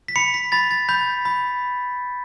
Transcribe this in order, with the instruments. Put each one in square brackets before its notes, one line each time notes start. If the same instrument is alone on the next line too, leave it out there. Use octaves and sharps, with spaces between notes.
[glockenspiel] B6
B5 C#7
B6
B5 A6
A6
B5 G6
B5